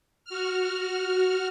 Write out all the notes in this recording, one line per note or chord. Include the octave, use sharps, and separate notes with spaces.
F#4 F6